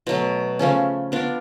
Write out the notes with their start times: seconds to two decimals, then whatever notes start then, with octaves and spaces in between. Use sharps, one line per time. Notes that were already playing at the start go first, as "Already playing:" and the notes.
0.07 B2 F#3 A3
0.59 C#3 F3 A3 C#4
1.12 B3 D4 F4 A#4